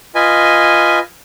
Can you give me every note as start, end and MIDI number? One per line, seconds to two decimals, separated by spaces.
0.15 0.99 65
0.15 0.99 71
0.15 0.99 75
0.15 0.99 80